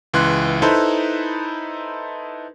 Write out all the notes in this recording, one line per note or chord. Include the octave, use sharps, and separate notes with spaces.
C#2 E3 C6 F#6
D#4 E4 A4 B4 C5